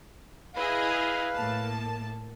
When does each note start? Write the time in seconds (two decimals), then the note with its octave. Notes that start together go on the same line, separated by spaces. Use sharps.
0.56 E4 G#4 B4 D#5 F5
1.36 A2 A#3 A5